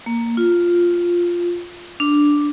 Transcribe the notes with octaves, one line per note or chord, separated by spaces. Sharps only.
A#3
F4
D4